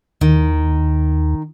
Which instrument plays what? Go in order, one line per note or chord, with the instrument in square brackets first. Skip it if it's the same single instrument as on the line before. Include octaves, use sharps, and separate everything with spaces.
[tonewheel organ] D#2 [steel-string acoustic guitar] D#3